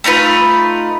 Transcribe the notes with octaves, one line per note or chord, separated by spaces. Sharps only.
A3 D#4 F4 B4